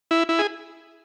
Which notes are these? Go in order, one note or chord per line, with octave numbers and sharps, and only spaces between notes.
E4
E4
G#4